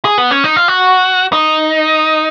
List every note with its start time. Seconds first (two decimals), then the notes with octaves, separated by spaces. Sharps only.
0.05 G#4
0.18 B3
0.31 C#4
0.44 D#4
0.56 F4
0.68 F#4
1.33 D#4